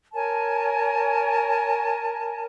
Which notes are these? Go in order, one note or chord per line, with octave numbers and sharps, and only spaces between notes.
A#4 C#5 G#5 A5